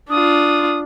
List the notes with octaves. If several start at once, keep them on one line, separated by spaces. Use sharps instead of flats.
D4 F4 D#6